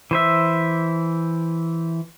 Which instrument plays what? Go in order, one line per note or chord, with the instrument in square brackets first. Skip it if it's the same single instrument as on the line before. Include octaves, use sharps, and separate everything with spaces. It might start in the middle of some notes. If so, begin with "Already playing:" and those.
[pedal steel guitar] E3 C5 E5